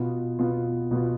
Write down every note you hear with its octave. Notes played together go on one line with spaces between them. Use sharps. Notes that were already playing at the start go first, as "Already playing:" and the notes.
Already playing: B2 B3 F4
B2 B3 F4
B2 B3 F4